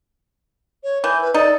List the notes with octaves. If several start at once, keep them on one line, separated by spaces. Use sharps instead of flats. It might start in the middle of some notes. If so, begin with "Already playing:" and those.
C#5
E3 G6
B4
D#4 A4 D5